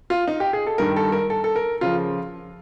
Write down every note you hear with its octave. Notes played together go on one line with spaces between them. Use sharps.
F4
D#4
G4
G#4
A4
G2 D#3 A#4
A4
A#4
A4
A4
A#4
C#3 F3 F4